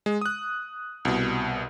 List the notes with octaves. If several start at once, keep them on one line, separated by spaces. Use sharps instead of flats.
G#3
D#6 F#6
C2 B2